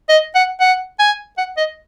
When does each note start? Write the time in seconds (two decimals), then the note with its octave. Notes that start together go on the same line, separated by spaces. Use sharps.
0.09 D#5
0.35 F#5
0.60 F#5
0.99 G#5
1.38 F#5
1.57 D#5